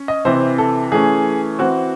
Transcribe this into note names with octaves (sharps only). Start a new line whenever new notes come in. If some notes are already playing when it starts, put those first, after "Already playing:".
Already playing: C#4
D#5
C3 E3 C4 C5
A4
E3 A3 C#4 G#4
E3 C4 F#4